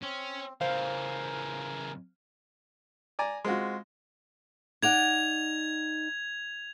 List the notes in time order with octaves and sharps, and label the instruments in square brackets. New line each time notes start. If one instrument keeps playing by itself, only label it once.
[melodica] C4 [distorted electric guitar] C#4
[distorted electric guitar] C#3 E3 [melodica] A#4 G#5 [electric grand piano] C5 F5
[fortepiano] D5 G#5 A#5
G#3 C4 F4 F#4
[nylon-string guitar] D#4 D5 F#5 [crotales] G#6 F7